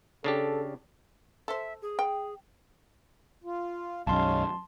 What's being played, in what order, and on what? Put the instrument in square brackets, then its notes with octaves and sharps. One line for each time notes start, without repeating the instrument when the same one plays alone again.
[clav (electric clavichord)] C#3 D4 G4 [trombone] A4
[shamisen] A4 C5 [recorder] E5
[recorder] G#4
[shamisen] G5
[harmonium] F4
[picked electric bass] B1 F#2 [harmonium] G#3 C#4 F5 [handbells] A5 C6